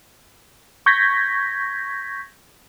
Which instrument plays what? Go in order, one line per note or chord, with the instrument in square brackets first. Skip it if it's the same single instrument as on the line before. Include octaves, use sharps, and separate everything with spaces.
[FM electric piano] C#6 G6 G#6 A#6 B6